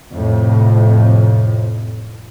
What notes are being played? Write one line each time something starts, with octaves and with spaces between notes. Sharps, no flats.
F2 A2 C3